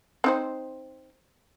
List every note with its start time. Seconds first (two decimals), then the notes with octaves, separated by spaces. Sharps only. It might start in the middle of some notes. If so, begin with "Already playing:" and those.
0.24 C4 D#4 C5